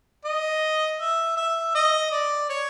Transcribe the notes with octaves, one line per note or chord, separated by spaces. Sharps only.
D#5
E5
E5
D#5
D5
C#5